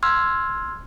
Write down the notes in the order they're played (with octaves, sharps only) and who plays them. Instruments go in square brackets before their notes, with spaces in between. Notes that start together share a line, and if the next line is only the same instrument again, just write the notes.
[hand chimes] C6 E6 F6 G#6